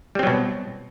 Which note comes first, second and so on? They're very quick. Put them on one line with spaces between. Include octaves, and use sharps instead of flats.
G3 C4 F#3 B2